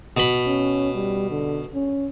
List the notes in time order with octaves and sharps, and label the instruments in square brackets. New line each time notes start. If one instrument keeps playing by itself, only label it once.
[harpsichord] B2 B5
[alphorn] C#4
G3
D3
C#4